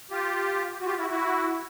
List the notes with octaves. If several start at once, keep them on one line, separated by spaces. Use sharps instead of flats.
F4 G4
F#4
F4 G4
E4 F#4
E4 F#4